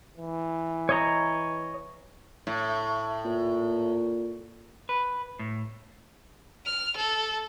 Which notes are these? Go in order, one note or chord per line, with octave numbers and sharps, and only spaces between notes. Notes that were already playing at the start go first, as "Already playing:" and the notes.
E3
C#5 D#5 A#5
A2
A#2
B4
A2
F6
A4